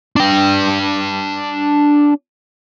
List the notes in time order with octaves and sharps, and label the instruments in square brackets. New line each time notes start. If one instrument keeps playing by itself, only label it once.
[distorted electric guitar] D4 G5